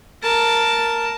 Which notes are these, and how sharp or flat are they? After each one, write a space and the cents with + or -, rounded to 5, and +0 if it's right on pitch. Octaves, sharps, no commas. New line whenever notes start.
A#4 +0 A5 +0